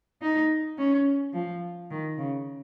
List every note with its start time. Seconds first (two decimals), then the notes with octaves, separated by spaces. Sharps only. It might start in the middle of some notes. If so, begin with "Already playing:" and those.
0.22 D#4
0.78 C#4
1.34 F3
1.91 D#3
2.18 C#3